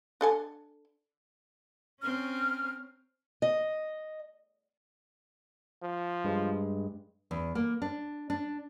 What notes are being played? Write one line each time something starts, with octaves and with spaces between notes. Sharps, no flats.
D4 A4 G#5
C4 C#4 F6
D#5
F3
G2 G#3
E2
A#3
D4
D4